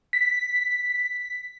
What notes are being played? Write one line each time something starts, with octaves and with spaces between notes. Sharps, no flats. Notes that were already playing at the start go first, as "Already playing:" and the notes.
B6